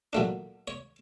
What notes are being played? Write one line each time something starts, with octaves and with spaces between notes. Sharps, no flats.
A#2 F#3 A3 D4
C#5